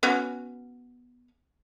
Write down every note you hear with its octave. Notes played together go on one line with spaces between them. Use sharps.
B3 C#4 F#4